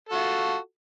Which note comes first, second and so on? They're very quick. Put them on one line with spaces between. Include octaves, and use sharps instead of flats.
A4 F#4 F4